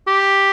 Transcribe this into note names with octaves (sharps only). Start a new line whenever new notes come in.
G4